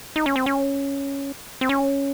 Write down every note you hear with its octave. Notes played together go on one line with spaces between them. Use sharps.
D#4
C#4
C4
C#4
C4
C#4